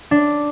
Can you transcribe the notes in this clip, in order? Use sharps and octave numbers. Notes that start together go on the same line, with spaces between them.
D4